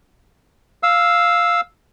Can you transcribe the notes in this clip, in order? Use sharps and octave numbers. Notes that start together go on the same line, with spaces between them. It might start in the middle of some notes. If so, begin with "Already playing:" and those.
F5 E6